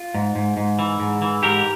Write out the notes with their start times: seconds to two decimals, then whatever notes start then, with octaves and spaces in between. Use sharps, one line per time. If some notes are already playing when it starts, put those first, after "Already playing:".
Already playing: F4
0.15 G#2
0.35 G#2
0.57 G#2
0.79 E3
1.00 G#2
1.22 E3
1.43 G#2 G4 A#4